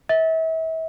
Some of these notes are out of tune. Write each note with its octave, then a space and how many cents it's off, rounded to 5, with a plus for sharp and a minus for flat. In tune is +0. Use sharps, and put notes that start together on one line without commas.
E5 -35